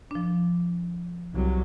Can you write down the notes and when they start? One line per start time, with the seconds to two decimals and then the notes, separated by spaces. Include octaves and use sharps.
0.11 F3 D4
1.33 C2 F#3